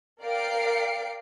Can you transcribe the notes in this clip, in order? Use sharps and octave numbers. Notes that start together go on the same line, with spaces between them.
A#4 D5 F5 G5 C7 D7